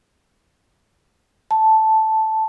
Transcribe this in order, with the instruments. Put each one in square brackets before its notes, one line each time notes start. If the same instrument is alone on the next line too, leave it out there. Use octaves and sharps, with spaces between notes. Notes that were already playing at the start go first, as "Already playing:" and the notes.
[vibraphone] A5